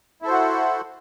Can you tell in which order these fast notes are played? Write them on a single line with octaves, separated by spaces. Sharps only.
E4 A4 C5 F#4 F#5